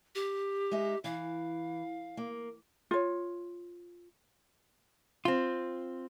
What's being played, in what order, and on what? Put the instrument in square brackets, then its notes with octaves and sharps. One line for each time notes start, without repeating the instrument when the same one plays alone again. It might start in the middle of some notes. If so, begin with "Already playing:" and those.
[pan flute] G4
[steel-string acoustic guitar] G#3 D#4 E5
[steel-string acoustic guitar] E3 [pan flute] F5
[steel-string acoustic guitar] A#3
[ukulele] F4 C#5
[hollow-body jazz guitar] C4 F4